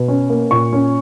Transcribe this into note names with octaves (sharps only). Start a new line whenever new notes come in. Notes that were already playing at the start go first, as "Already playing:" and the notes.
Already playing: B2
C#4
A#3
A#2 C#6
C#4